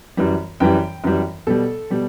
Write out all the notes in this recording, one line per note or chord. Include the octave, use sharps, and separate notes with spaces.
F#2 E3 G3
F#2 E3 G3 G5
F#2 E3 G3
B2 G3 A4
B2 G3